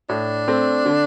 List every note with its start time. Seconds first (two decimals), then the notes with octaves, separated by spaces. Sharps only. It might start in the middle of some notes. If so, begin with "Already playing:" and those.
0.09 A2 D4
0.48 A3 C4
0.86 D3